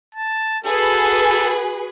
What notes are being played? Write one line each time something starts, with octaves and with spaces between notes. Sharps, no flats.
A5
F#4 G#4 A4 B4